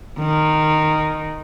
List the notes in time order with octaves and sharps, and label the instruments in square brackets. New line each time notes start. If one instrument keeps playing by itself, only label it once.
[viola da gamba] D#3